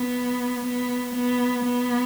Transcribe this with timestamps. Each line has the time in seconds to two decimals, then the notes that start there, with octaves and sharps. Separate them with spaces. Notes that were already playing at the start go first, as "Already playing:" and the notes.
Already playing: B3
0.65 B3
1.15 B3
1.64 B3